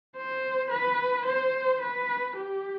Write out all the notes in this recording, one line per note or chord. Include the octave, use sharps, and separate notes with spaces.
C5
B4
C5
B4
G4